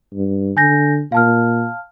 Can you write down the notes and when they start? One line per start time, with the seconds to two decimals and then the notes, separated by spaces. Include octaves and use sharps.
0.13 G2
0.57 D3 G#5 G6 A#6
1.12 A#2 F5 A5 F6